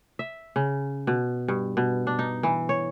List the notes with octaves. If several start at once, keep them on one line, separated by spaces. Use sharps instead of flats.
E5
C#3
B2
G2
B2
D4
D#4
E3
C#5